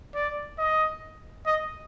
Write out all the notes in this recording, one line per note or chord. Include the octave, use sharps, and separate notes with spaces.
D5
D#5
D#5